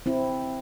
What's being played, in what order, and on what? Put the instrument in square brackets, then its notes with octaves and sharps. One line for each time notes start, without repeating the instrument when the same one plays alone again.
[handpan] C4 E4